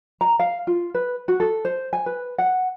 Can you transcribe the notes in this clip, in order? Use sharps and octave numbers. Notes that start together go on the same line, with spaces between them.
A#5
F5
F4
B4
F#4
A4
C5
G#5
B4
F#5